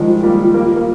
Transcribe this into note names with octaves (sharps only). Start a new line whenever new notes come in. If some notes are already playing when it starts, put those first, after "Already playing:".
Already playing: D#3 F3 G3 G#3 F4
G3 A#3
G3 A#3
A#3